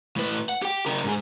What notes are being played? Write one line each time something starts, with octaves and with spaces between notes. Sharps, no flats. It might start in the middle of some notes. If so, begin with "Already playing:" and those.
A2 B4
F#5
G4 G5
C#3 A#4
G#2 G#4